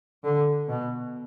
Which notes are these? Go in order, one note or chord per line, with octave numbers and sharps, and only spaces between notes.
D3
B2